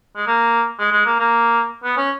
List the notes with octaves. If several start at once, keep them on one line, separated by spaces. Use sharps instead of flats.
G#3
A#3
G#3
G#3
A#3
A#3
B3
C#4